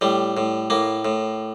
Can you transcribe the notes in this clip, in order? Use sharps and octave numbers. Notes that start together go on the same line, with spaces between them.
A2 G3
A2
A2 A#3
A2